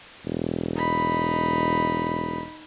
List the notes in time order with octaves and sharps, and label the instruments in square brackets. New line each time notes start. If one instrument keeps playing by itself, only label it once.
[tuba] E1
[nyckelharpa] D#4 B5